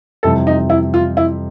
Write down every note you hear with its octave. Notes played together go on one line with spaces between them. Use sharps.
F2 C3 E3 G3 A4
D#4
E4
F4
E4